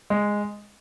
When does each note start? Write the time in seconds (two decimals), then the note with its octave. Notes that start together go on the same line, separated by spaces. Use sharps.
0.10 G#3